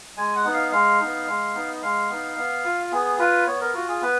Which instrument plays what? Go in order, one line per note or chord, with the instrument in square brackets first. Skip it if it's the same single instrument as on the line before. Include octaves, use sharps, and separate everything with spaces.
[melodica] G#3 G#5
F#5
B3 D#4
F5
G#3 F5
B3 D#4
G#3
B3 D#4
G#3 F5
B3 D#4
B3
F4
B3 G#4
F4 B4
B3 C#5
A#4
F4 F#4
G#4
B3 B4